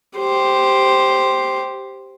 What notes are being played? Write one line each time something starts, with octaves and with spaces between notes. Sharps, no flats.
G4 C5